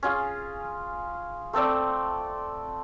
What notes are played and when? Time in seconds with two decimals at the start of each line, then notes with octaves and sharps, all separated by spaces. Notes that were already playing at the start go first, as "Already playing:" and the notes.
0.03 C#4 F4 G#4
1.53 A3 C4 A4 D5